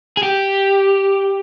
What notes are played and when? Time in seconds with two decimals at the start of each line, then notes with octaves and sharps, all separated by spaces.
0.17 G#4
0.23 G4